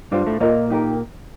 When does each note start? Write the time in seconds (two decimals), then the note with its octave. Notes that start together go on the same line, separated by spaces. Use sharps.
0.11 G2 G3 D4 F4 C5 F5
0.26 A2 A3
0.40 A#2 A#3 F4 A#4 D#5 A#5
0.70 D#4 G4 A#4